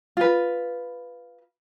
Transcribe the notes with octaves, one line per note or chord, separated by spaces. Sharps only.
F4 B4